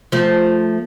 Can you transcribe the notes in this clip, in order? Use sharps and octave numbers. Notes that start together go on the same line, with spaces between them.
F3 A3